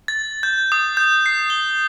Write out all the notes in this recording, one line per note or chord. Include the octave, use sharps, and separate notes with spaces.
A6
G6
D#6
G6
C7
G7